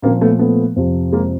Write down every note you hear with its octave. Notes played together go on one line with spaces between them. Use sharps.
A#2 F3 A#3 C4
A3 B3
A3 B3
F2 C3 F3
G#3 A#3